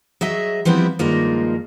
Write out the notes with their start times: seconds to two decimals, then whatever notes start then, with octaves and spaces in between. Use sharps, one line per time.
0.21 F#3 G#4 D#5 E5
0.65 F3 G3 B3 C4 E4
0.99 G2 D#3 F3 G#3 A#3 F4